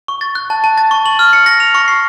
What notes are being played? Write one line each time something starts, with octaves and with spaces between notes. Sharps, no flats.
C#6
A6
F#6
A5
A5
A6
C#6
F#7
F6
C#7
A#6
F7
C#6
C7